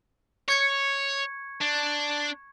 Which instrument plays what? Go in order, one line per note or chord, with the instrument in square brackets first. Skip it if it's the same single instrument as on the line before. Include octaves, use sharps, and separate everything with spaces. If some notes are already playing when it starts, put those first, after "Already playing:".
[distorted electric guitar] C#5 [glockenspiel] C#6 G#6 C#7
[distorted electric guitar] D4